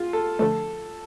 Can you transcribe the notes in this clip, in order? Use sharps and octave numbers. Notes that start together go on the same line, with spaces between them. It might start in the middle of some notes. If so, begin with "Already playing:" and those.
Already playing: F4 G#4
A4
D3 F3 A3 A4